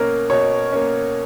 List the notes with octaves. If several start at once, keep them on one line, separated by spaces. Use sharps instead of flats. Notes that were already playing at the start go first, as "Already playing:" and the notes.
Already playing: B2 A#3 C#4 A#4
B2 C#5
A#3 C#4